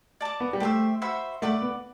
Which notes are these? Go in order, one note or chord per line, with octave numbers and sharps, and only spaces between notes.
D5 A5 D6
B3
G3
A3 G4 C5 E5
F#4 C5 E5 B5
A3 D5 F#5 B5 D6
B3